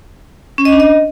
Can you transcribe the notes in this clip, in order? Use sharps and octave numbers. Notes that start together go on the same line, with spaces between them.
C#4
D#5
D4
D#5